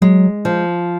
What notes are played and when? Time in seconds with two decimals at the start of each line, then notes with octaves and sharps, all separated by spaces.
0.01 F#3 G#3
0.45 F3